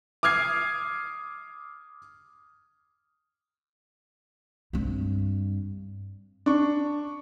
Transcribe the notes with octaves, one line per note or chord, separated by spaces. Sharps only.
D6 D#6 F6 G#6 C7
G2 C4
D4 C#6